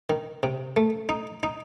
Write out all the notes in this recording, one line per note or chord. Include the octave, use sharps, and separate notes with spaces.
D#3
C3
A3
D#4
D#4